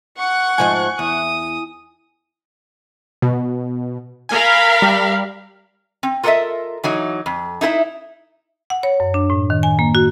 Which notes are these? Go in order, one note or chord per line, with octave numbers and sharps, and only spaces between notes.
F#5 C#6 F#6
G#2 F3 D#5 G#5
E2 D#6
B2
A#4 F5 G#5 B5
G3
C4
F4 A4 A#4 C5 D#5 E5
E3 F#3 D#4
F2
D#4 E4 A4 E5
F#5
C#5
F#2
D4
A2
D#3
G#5
A#3
F#4